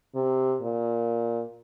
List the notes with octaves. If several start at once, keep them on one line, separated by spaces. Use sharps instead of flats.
C3
A#2